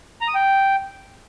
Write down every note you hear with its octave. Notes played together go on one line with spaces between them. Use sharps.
A#5
D#6
G5